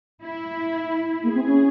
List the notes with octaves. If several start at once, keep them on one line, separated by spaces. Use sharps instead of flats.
E4
A#3 G#4
C4
C#4